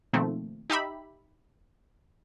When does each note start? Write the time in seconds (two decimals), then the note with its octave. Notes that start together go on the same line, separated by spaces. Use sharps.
0.13 B2 D#3 F3 A3 A#3 C4
0.70 D#4 G4 E5 B5